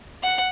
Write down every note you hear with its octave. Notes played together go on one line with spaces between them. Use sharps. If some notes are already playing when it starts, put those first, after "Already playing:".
F#5